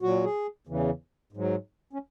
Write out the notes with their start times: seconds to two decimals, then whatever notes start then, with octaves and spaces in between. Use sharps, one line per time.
0.02 A#2 F#3 F#4
0.24 G#4
0.67 E2 C#3 E3
1.32 G#2 F#3
1.93 C#4